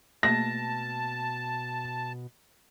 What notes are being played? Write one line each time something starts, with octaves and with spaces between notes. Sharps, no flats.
B2 A3 A#3 G#4 A5 A#6